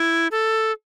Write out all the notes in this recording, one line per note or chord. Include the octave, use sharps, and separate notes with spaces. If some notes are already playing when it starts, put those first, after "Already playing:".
Already playing: E4
A4